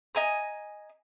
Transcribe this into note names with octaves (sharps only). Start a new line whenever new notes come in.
D#5 G#5 A#5